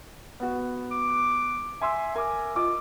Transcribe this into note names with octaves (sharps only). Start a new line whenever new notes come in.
B3 F#4
D6
E5 G#5 C6 E6
A#4 G#5 D6
F4 D#5 D6